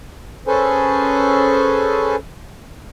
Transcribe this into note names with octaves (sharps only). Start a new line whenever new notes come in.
C#4 G#4 A4 B4 C5 G#5